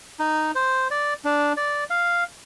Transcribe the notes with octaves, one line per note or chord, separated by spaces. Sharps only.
D#4
C5
D5
D4
D5
F5